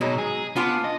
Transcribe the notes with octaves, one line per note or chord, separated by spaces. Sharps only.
B2 F#3 G#3 D#4
G#4
B3 D4 F4 G#5
D#5